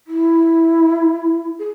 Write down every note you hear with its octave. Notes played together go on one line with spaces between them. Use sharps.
E4
G#4